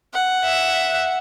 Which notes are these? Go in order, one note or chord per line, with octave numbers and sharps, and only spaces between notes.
F#5
E5